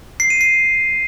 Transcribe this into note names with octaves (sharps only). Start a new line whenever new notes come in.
C7
D#7
C7